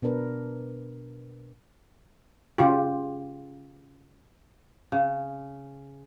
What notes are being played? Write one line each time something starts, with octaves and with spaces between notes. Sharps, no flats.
B2 B3 D4 A#4 B4
C#3 F4 G4
C#3